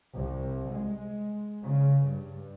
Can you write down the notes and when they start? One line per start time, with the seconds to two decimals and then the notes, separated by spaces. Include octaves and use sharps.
0.15 C2
0.72 G#3
1.62 C#3
2.06 G2